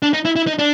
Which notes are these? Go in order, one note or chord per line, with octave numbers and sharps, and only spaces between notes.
D4
D#4
E4
E4
D#4
D4